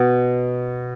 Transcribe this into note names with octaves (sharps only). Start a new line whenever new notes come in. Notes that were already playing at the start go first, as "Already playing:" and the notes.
Already playing: B2